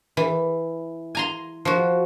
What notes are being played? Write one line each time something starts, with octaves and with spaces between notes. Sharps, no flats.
E3
G#5 A#5 C6
F3 F#4